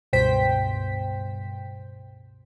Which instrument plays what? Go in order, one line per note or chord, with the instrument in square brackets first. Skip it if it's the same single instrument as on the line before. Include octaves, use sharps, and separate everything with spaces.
[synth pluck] C#2 G2 B2 C5 G5 B6